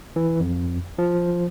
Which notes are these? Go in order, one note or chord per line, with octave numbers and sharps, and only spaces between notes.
E3
F2
F3